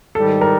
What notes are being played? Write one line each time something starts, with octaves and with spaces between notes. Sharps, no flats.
G#2 D#3 G3 A4
A#4